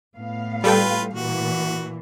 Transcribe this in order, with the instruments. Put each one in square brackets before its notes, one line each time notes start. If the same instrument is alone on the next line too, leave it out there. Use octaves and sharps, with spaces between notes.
[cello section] A2 B3 F5
[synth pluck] G3 A4 G5 [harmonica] F4 B4
[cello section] A#2 E3 [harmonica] F#4